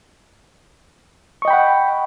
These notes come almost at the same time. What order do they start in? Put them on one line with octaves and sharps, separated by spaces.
C#6 D#5 G5 B5 F#5